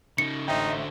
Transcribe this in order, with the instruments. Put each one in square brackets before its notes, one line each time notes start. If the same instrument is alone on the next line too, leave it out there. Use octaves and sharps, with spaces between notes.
[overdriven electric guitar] C#3 D#4 [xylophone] C#7
[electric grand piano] A1 E5 G5 [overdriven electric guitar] D3 C5 [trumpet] D#4